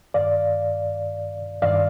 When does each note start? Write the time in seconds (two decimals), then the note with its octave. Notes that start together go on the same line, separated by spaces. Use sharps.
0.14 G2 D#3 D5 F5
1.62 G2 D#3 D5 F5